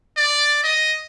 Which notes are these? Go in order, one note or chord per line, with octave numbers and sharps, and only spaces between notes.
D5
D#5